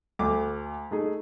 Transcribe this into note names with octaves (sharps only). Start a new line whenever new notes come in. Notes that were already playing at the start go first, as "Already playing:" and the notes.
D2 A3 D6
A3 D#4 G#4